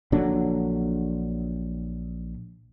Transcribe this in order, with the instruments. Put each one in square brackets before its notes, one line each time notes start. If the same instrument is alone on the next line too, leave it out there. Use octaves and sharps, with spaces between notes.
[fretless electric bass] A#1 D3 F#3 D4